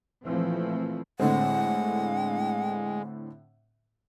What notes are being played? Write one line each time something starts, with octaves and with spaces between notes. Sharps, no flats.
A#2 E3 F3 A3 C4
A2 D3 G#3 C4 F#5